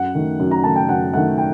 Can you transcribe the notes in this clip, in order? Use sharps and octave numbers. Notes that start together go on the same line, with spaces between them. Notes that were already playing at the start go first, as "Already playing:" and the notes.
Already playing: F#2 F#5
D#3 A3
F#2
A#5
D#3 A3 A5
G5
F#2 F#5
D#3 A3 F#5
G5